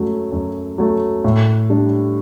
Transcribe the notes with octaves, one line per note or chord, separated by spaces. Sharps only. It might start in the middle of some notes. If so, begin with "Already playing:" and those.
Already playing: F#2 F#3 A3
F#2
F#3 A3
A2
G3 D4